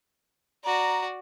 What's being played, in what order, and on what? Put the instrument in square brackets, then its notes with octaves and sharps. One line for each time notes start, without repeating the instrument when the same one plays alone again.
[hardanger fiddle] F#4 D5 [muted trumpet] A#5